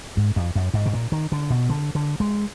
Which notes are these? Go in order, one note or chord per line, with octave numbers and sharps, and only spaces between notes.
G#2
F2
F#2
G#2
B2
A#2
D#3
D3
B2
D3
D3
G#3